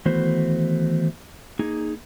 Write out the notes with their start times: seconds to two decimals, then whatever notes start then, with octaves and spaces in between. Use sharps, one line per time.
0.05 D#3 E3 A3 B3 F#4 C5
1.59 A#3 D#4 G#4